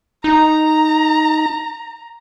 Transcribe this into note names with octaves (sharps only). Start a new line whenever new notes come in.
D#4 A#5